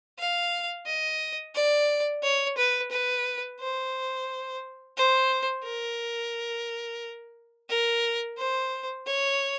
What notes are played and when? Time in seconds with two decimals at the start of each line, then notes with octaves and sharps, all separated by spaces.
0.19 F5
0.86 D#5
1.55 D5
2.23 C#5
2.57 B4
2.91 B4
3.60 C5
4.97 C5
5.65 A#4
7.69 A#4
8.38 C5
9.06 C#5